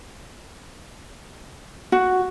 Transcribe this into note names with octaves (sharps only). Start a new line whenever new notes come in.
F#4